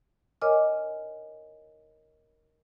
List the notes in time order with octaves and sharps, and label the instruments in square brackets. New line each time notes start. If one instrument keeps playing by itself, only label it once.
[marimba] A#4 C#5 D#5 G#5 D6 F6